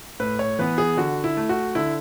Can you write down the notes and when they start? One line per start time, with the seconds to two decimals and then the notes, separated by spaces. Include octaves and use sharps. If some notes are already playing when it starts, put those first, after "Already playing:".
0.20 A2 B4
0.39 C#5
0.59 E3 B3 B4
0.78 G#4
0.97 D3 F#4
1.24 E4
1.37 A3
1.49 F#4
1.75 D3 E4